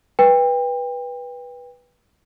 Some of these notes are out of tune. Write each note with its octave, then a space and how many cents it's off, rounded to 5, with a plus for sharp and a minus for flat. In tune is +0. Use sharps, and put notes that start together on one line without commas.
B4 -15 G5 +30